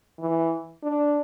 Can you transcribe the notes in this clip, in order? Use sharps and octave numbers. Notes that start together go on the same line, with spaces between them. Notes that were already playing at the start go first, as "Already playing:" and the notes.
E3
D4